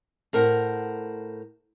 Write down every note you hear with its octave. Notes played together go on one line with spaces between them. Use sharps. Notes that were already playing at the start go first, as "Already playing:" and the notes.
A2 A#4 C5 F#5